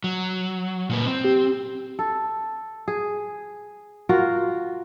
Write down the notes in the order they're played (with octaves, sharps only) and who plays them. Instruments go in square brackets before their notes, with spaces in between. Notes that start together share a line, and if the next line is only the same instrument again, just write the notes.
[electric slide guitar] F#3
A#2 A#3 B4
C4
[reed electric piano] G4
[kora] A4
G#4
F4 F#4 A#4